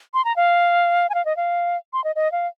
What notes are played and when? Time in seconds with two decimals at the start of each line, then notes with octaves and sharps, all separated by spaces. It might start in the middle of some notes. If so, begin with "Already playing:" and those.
0.14 C6
0.25 A#5
0.36 F5
1.10 G#5
1.14 F5
1.25 D#5
1.37 F5
1.93 C6
2.04 D#5
2.16 D#5
2.32 F5